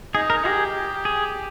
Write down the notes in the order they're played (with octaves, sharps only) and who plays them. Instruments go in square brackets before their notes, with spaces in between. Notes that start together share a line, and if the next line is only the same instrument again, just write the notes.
[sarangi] D#4 [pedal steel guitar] G#4
[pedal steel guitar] A#4
[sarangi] G4 [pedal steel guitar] G#4
[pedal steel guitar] G#4